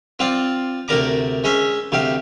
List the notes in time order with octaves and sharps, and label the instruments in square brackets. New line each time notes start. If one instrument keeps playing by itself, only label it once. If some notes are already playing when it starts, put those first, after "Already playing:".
[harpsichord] C4 F4 D5 F5
D2 C3 A#4 D5 A#5 D6
G#3 C#4 C5 E5
D2 C3 G4 F5